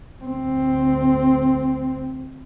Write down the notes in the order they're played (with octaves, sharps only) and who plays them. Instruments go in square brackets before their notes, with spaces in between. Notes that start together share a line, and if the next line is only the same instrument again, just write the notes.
[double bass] D2 C4